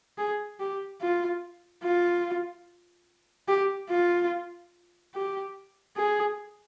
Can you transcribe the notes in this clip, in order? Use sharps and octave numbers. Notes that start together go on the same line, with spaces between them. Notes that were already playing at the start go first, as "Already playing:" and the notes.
G#4
G4
F4
F4
G4
F4
G4
G#4